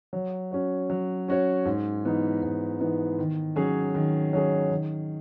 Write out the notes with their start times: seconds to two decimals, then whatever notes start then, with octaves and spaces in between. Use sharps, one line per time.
0.13 F#3
0.51 C#4 F#4 C#5
0.90 F#3
1.28 C#4 F#4 C#5
1.65 G#2
2.04 E3 B3 D#4
2.42 G#2
2.80 E3 B3 D#4
3.19 D#3
3.56 F#3 C#4 G#4
3.95 D#3
4.33 F#3 C#4 G#4
4.71 D#3